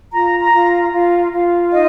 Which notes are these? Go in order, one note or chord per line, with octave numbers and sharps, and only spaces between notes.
F4 A#5
A#5
F4
F4
F4
D#4 D#5